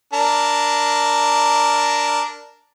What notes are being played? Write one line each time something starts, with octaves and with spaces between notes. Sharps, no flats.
D4 A#4